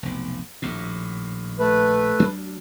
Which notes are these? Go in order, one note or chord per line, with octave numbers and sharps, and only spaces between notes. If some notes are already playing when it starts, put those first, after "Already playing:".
F1 B1
A#1 D#2 A2
A3 B4
D2 F#3 D4